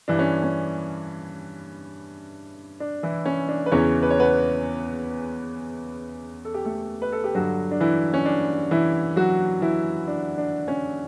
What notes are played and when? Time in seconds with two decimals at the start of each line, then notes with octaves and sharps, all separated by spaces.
0.08 G2 E3 D4
0.19 C#4
0.43 C#4
2.80 D4
3.03 E3 E4
3.26 C#4
3.49 D4
3.66 B4
3.72 E2 C#3 E3 C#4 C#5
4.02 B4
4.10 C#5
4.20 B3 B4
6.45 A4
6.54 G4
6.65 A3 A4
7.02 B4
7.12 A4
7.24 G4
7.35 G2 D3 F#3 F#4
7.71 D4
7.80 E3 E4
8.14 C#4
8.26 D4
8.71 E3 E4
9.16 F#3 F#4
9.62 E3 E4
10.08 D4
10.38 D4
10.68 C#4